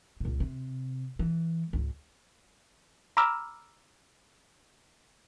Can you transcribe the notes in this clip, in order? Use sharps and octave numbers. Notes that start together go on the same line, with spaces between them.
C#2 A#2
C3
E3
C#2 G#2
A#5 B5 D6 E6 F6